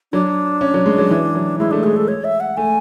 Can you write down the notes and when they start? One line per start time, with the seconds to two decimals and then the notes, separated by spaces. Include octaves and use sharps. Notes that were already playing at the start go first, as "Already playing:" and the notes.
0.12 F#3 D4
0.61 C#4
0.74 F#3
0.86 G#3
0.98 F#3
1.11 E3
1.35 F#3
1.59 G#3 E4
1.71 A3 D4
1.84 G#3 G#4
1.96 A4
2.08 C#5
2.24 E5
2.40 F#5
2.57 A3 G#5